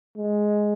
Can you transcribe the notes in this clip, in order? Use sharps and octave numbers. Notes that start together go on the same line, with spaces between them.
G#3